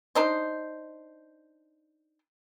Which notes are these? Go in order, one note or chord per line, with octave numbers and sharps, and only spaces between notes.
D4 D#4 C5